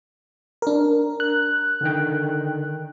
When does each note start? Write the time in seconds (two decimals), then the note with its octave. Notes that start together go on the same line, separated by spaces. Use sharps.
0.62 D4 A#4
1.20 F#6
1.81 D3 D#3 G5